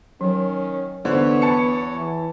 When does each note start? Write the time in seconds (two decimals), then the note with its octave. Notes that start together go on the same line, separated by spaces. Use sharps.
0.21 D#3 F#3 C#4
1.05 E2 D3 B3 C5 C#5
1.42 A5 C#7
1.95 E3